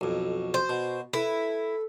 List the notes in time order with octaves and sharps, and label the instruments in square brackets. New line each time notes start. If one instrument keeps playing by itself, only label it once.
[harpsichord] B1 F2 [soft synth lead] F#4
[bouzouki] C5
[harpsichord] B2
[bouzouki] E4 [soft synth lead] A4 [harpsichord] B4